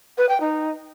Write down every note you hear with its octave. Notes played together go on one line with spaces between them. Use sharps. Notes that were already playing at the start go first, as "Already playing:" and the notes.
B4
G5
D#4